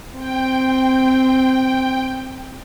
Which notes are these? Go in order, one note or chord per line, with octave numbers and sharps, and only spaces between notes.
C4 G5